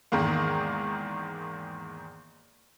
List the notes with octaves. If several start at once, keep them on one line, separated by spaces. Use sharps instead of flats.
E2 G#2 D#3 G#3 A#3